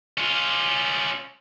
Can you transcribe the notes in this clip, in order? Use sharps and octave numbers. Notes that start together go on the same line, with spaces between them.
C#4 F4